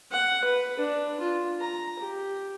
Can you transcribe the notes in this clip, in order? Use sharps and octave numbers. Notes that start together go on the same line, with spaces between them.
F#5
B4
D4
F4
A#5
G4